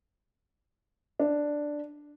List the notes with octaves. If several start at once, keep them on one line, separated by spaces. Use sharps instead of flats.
D4